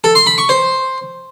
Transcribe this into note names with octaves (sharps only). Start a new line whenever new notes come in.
A4
C6
B5
C#6
C5